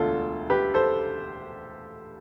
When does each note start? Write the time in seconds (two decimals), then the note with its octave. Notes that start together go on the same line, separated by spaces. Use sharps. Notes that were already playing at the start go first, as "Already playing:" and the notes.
Already playing: E1 D2 D3 F4 A4
0.50 G4 B4
0.74 A4 C5